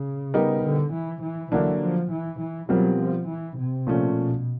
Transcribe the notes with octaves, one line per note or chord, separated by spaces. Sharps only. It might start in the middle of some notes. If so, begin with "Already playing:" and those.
Already playing: C#3
G3 B3 D#4 G4 A#4
D3
E3
E3
D3 E3 F#3 A#3 D4
F3
E3
E3
B2 F#3 G3 C4 F4 A#4
F3
E3
C3
A#2 F3 A3 C#4
B2